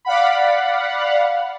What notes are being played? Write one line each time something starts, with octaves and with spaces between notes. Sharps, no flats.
D5 F5 F#5 B5